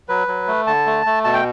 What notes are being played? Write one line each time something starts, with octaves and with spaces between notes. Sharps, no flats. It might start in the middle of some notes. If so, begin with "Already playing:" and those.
F#3 B4
F#3
A3
D3 A5
A3
A3
B2 A5
G5